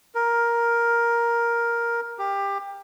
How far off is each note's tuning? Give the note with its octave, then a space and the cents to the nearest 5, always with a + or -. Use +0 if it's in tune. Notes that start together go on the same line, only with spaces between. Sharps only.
A#4 +10
G4 +20